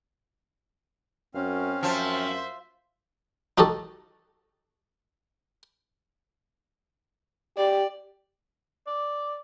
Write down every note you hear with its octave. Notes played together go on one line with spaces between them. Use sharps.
F#2 C4 C#4 F5
F#2 F3 C5 E5
D#4 F#4 G4 A4 D#5
G4 D5
D5